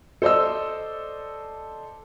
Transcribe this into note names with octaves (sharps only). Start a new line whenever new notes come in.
A4 C5 D5 D#5 E6